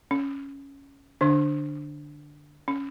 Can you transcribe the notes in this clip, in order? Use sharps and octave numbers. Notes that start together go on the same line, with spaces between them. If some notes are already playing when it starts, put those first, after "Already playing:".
C#4
D3 D4
C#4